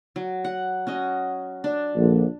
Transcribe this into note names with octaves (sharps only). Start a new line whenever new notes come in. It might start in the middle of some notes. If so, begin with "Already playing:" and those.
F#3
F#5
C#4 F#4 D#5
D4
A#1 D3